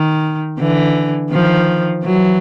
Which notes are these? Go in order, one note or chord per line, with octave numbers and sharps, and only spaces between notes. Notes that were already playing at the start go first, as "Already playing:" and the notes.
Already playing: D#3
D3 E3
D#3 F3
E3 F#3